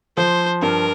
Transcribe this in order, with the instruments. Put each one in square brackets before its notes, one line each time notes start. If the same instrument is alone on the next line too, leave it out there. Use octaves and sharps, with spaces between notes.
[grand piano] F3 [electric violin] C5
[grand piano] G2 [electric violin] A#4